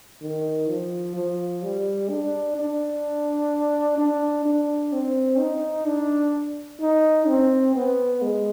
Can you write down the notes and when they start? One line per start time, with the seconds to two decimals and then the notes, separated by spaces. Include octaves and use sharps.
0.21 D#3
0.69 F3
1.15 F3
1.63 G3
2.10 D4
2.57 D4
3.98 D4
4.45 D4
4.93 C4
5.39 D#4
5.87 D4
6.81 D#4
7.28 C4
7.75 B3
8.22 G#3